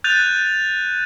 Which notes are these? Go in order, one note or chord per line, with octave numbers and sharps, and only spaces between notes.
F#6 G6 A6 D#7 F7